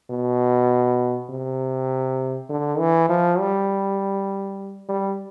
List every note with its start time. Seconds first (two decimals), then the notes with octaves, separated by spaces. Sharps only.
0.10 B2
1.30 C3
2.49 D3
2.79 E3
3.09 F3
3.39 G3
4.88 G3